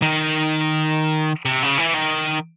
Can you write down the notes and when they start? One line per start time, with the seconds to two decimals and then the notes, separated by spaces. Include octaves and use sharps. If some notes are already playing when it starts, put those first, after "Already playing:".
0.02 D#3
1.45 C3
1.62 C#3
1.78 E3
1.94 D#3